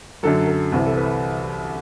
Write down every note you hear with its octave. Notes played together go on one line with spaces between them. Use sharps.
F#2 D3 F#3 A4
A4
C2 C3 E3
A4
B4